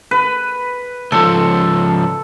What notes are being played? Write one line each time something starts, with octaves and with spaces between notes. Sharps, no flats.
B4
C#2 F3 A4